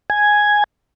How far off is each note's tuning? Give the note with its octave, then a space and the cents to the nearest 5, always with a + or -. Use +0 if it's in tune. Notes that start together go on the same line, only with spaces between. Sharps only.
G#5 +0